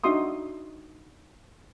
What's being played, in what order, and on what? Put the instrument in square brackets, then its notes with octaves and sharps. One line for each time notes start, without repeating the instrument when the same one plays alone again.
[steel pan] D4 D#4 F#4 E5 C6 D#6